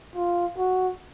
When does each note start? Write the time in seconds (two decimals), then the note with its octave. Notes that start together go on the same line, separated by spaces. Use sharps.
0.16 F4
0.58 F#4